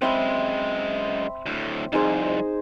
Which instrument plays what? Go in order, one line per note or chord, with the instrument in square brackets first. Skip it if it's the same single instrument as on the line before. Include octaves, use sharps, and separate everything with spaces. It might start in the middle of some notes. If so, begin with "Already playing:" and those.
[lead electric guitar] F#2 G#3 [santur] C4 E5 B5
[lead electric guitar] D2 A2
[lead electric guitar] C2 F2 [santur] D#4 G#4 C5